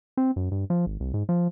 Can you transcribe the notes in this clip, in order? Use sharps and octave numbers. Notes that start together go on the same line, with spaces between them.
C4
F#2
G2
F3
G#1
C2
G#2
F3